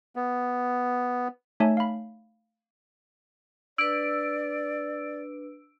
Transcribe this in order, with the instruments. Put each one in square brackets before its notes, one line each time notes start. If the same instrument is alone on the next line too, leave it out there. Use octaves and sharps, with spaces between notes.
[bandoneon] B3
[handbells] A3 D#4 C#5 E5 G#5 A5
F5 B5
[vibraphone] D4 B4 [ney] D5 [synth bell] E6 D7